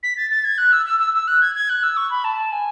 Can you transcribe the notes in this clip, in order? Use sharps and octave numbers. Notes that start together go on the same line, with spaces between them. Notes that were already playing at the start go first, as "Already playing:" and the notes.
B6
A6
A6
G#6
F#6
E6
E6
E6
E6
F#6
G#6
G#6
F#6
E6
C#6
B5
A5
G#5